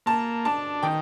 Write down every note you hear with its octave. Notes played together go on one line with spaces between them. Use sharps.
A#3 A5
D4 A5
D#3 G5